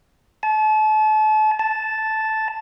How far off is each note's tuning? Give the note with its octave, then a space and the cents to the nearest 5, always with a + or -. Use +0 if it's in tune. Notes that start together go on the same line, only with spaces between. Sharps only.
A5 -35
A5 -5